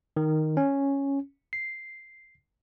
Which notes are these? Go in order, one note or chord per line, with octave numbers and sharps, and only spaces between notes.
D#3
C#4
C7